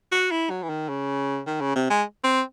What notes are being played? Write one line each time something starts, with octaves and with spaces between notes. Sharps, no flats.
F#4
E4
F#3
E3
D#3
C#3
D#3
C#3
C3
G#3
C4